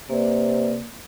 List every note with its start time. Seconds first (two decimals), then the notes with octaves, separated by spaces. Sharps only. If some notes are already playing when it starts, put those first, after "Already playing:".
0.09 C3 A#3 B4 D5